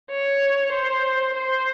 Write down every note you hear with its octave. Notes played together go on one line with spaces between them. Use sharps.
C#5
C5
C5